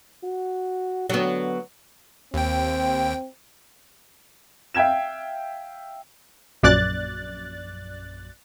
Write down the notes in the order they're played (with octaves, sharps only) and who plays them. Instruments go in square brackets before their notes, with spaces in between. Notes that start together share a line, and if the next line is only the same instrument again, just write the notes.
[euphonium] F#4
[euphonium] D3 [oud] F#3 B3
[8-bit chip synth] D#2 G5 [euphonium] C4
[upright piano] E5 F5 G5 G#6 E7
[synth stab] A#1 F#2 D5 F#6 A6